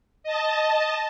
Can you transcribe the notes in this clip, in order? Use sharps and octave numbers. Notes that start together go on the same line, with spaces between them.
D#5 A5